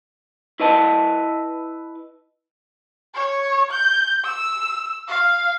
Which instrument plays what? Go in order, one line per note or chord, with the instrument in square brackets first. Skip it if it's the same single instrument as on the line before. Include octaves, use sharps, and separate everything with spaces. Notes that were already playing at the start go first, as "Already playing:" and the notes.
[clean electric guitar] E4 B4 D#5 A5
[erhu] C#5
G6
E6
F5